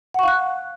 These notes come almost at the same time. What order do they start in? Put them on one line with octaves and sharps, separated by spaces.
F#5 C#6 F5 F#6